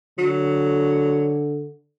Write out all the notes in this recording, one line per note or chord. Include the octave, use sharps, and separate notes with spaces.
D3 F#3